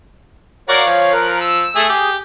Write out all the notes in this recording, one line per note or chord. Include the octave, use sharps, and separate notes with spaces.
F#4 A#4 C#5 D5 F5
F3
A#4 F#6
E6
A3 G#4
G4 G#4